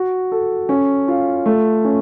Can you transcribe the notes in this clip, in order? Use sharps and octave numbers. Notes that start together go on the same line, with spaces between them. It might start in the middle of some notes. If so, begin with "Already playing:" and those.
Already playing: F#4
A4
C#4
F4
A3
C#4